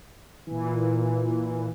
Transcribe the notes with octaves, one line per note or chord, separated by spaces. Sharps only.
A#2 E3